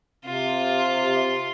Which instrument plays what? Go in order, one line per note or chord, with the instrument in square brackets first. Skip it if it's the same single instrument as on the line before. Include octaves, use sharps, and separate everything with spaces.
[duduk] C3 [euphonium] C4 [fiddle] F4